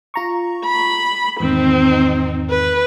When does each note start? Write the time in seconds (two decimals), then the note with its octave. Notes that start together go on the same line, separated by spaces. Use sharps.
0.14 F4 A#5 C#6
0.65 B5
1.40 E2 G#2 D#3 C4 D#4
2.50 B4